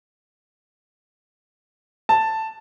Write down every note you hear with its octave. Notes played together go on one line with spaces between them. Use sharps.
A5